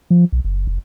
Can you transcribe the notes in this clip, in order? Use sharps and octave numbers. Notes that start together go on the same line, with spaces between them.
F3
B1
F#1
F1